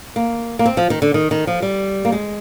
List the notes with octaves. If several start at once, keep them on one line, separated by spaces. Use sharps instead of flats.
A#3
A#3
C4
F3
D#3
D3
D#3
D#3
F3
G3
A#3
G#3